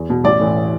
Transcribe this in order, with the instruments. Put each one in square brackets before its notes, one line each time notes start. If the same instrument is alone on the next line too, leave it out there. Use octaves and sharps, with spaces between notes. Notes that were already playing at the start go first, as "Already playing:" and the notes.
Already playing: [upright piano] E2
B2
A1 D5
A2 E3